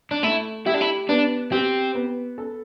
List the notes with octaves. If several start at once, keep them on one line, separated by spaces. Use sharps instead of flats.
D4
A3 E4
E4 G4
D4
E4
B3 D4
C4 G4
B3
A4